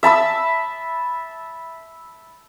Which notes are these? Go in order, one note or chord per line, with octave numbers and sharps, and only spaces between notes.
E5 A5 B5 E6